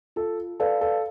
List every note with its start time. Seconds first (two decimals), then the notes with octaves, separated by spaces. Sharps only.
0.16 F4 A4
0.60 A4 B4 D5 F5
0.81 A4